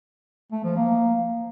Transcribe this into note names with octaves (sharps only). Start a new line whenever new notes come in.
A3
F3
A#3